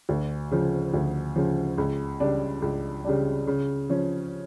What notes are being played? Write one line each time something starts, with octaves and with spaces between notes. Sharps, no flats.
D2
C#3 F3
D2
C#3 F3
C#2
C#3 G3 D4
C#2
C#3 G3 D4
C#3
F3 C#4